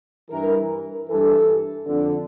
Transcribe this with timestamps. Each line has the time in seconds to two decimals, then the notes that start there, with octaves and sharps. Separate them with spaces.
0.31 G2 E3 A#4
1.09 G2 E3 A4
1.86 F2 D3